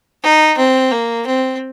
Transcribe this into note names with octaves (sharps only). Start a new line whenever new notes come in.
D#4
C4
A#3
C4